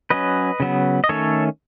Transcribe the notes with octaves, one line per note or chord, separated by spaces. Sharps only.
F#3 C#4 B4 D#5
C#3 F#3 B3
D#5
D#3 A3 C#4 A4 C#5